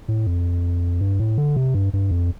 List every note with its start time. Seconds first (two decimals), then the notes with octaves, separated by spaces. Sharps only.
0.08 A2
0.27 F2
1.01 G2
1.20 A2
1.38 D3
1.56 C3
1.75 G2
1.94 G2
2.11 F2